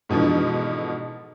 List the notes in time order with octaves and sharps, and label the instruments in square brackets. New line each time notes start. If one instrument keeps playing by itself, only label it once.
[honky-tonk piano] G#2 B2 D3 E3 F3